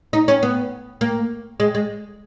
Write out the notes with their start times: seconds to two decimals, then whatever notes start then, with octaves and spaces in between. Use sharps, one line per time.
0.13 D#4
0.28 C#4
0.43 B3
1.01 A#3
1.60 G#3
1.75 G#3